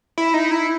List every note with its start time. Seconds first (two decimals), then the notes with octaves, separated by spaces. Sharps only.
0.18 E4
0.34 D#4
0.51 E4